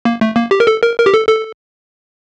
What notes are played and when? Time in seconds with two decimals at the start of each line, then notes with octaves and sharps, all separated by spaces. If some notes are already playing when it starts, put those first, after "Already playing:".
0.05 A#3
0.21 A3
0.36 A#3
0.51 G4
0.60 A#4
0.67 A4
0.83 A#4
0.98 A#4
1.06 G4
1.14 A4
1.28 A4